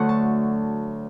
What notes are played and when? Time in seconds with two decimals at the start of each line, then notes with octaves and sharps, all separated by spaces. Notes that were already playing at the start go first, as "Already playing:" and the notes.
Already playing: D2 D3 F#3 A3 F#5
0.09 A5